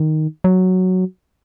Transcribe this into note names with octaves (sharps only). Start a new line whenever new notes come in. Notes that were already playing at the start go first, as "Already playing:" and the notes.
Already playing: D#3
F#3